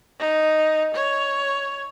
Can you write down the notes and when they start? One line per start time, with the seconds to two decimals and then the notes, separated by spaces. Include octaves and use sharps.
0.19 D#4
0.94 C#5